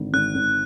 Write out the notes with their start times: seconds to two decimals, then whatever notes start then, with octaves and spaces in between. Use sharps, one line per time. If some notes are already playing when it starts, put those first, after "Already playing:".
Already playing: G#1 D3
0.13 G#1 F#6
0.35 G#1